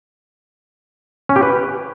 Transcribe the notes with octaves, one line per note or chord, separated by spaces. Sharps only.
C#4
G4
B4